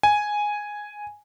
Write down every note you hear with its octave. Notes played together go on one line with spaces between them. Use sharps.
G#5